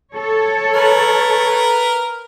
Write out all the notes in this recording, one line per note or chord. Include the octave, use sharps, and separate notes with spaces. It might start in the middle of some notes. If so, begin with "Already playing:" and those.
A4 C#5
A#4 B4